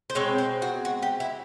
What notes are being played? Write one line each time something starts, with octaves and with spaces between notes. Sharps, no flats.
C5
B2 G#3 C4 C#5
C5
F#4
F#4
G4
E4